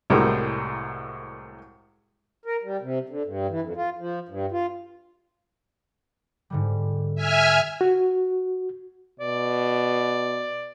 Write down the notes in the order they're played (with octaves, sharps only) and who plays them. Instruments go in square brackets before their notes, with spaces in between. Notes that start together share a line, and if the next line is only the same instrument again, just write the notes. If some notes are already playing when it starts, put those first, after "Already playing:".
[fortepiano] C2 A2 G3 G#3 F#4 A#4
[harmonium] A#4
G3
C3
D3
G2
E3
F2
F4
F3
G2
F4
[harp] G#2 D3 G3
[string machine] E5 G#5 F6
[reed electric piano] F#4
[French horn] B2 [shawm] D5